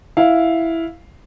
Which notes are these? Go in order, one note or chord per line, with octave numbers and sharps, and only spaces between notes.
E4 F5